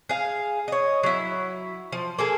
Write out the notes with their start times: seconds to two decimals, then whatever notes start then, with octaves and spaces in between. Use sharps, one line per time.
0.09 G#4 F5
0.68 C#5 D#5
1.03 F#3 E4
1.92 F3
2.19 A#3 G#4 A4